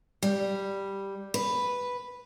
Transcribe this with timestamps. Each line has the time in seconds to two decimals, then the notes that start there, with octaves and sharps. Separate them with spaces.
0.23 G3
1.34 B4